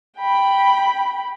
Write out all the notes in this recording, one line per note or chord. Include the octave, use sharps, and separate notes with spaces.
G5 B5